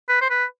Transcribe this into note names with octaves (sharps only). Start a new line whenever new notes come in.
B4
C5
B4